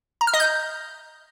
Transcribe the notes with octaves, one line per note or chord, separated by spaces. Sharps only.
A#5
F6
D#5
G6